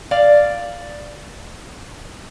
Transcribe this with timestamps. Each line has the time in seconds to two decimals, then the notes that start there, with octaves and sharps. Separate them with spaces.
0.11 D5 F5